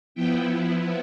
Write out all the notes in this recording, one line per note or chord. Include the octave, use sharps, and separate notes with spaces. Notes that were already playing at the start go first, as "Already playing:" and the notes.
F3 B3 E4 G5